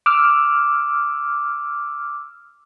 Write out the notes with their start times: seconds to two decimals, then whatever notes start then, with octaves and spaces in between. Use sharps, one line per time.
0.06 D6 E6 F6